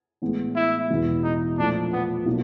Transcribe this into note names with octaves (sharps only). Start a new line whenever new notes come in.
A2 E3 G#3 B3
E4
E2 B2 G#3 B3 E4
D#4
A#2 F3 A3 D4
B3
B2 F#3 A#3